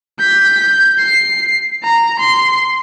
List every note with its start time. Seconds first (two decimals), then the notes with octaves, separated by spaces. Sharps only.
0.19 G6 B6
0.60 G6
0.99 C7
1.84 A#5
2.19 C6